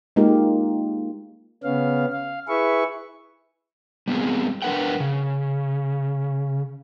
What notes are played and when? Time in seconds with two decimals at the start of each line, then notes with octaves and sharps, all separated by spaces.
0.16 G#3 A#3 D#4 F4 G4 A#4
1.64 C#3 B3 C#4 F5
2.12 F5
2.48 E4 G#4 B4 E5 C#6
4.08 G3 B3 C4 G#4
4.62 F3 D4 A#4 B4 F#5 G5
5.00 C#3